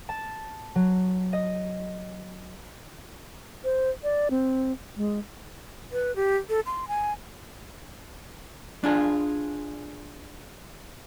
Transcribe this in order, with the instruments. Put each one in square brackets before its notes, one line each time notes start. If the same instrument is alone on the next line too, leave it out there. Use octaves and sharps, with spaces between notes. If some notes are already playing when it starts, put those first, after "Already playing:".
[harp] A5
F#3
D#5
[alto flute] C5
D5
C4
G#3
[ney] B4
G4
A4
C6
G#5
[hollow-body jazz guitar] D4 F4 G#4